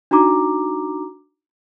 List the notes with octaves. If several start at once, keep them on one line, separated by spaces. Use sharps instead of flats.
D4 D#4 F#4 A#5 D6